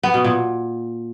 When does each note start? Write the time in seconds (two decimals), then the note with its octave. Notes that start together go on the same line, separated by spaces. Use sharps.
0.03 B3
0.14 B2
0.25 A#2